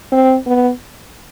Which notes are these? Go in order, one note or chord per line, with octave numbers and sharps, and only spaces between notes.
C4
B3